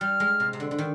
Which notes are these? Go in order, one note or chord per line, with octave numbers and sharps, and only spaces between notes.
G3 F6
G#3
C3
C3
D3
D3
D#3